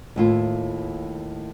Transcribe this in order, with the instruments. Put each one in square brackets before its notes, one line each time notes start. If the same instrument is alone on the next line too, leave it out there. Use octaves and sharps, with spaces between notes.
[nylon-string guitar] D#2 A2 F4